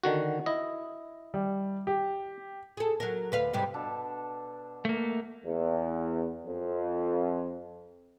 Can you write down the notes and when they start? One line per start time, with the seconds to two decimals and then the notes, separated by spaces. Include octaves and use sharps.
0.04 D3 D#3 F#4
0.46 E4 D#5
1.34 G3
1.87 G4
2.77 G#4 A4
3.00 F#3 A#4
3.32 D2 B4 F5
3.53 G#2 C3 G3
3.74 B2 D4 A4
4.85 A3 A#3
5.45 E2
6.46 F2